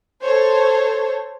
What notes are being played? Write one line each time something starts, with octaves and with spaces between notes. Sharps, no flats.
A4 C5 C#5